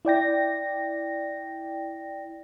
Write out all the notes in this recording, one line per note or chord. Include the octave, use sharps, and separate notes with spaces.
E4 D5 G5 A#6